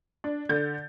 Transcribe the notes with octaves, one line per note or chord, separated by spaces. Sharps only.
D4
D3 G6 A6